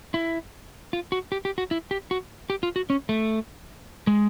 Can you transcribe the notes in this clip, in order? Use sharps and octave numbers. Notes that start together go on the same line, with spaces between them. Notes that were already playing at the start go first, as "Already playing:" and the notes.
E4
F4
F#4
G4
G4
F#4
E4
G4
F#4
G4
F4
F#4
C#4
A3
G#3